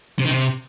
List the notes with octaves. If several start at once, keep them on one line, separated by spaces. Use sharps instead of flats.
C3
D#3
C3